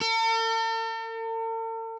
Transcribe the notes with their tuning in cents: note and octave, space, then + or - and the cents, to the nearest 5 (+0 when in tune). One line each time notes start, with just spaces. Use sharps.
A4 +45